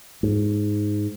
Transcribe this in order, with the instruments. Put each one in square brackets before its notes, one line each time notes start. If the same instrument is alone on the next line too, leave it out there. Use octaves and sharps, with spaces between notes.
[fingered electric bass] G#2